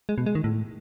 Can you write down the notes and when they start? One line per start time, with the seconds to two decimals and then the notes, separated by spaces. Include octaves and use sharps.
0.09 G#3
0.18 B2
0.26 G#3
0.35 D#3
0.44 A2